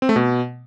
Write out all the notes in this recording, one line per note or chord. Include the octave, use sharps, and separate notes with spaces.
C4
A3
B2